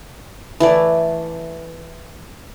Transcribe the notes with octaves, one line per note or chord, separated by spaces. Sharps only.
E3 A3 D5